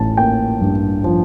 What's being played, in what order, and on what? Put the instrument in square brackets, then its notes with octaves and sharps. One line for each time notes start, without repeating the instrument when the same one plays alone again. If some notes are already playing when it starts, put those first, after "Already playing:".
Already playing: [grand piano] A1 A5
A#3 G5
G2
F3